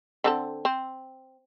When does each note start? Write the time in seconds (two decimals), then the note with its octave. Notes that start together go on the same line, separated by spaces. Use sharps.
0.24 D3 C4 A4
0.65 C4